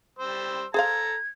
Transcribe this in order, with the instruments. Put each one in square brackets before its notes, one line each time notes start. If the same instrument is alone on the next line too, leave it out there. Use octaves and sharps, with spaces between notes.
[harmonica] G3 C5 E6
[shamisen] G#4 C5 F5 [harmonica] A4 A#5 [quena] G#6